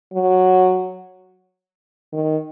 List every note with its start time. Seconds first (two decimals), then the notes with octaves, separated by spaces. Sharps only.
0.13 F#3
2.13 D#3